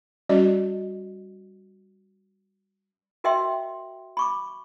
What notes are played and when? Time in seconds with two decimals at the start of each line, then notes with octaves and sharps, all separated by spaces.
0.29 G3 C#4 F#4 D5 D#5
3.24 F#4 A#4 D#5 E5 G5 C6
4.17 B5 C#6 D6